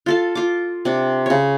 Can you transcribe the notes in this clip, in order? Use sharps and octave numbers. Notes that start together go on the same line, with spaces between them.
F4 A4 F5
F4 D6
C3 D4
C#3 C#5